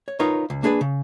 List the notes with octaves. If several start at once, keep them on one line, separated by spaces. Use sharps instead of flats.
C#5
D#4 F4 A#4 B4 C#5
C#2
A#3 D4 G#4 A#4 B4
C#3